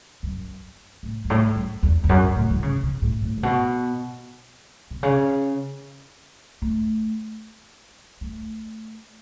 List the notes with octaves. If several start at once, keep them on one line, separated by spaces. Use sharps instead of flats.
F#2
A2
F#2
A2
F#2
E2
E2
F#2
A2
E3
C#3
B2
A2
A2
A2
B2
B2
C#3
A3
A3